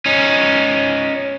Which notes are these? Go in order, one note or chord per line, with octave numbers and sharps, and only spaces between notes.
C#4 D#4